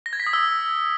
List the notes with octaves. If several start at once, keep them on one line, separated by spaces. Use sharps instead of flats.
A#6
G#6
B6
D#6
E6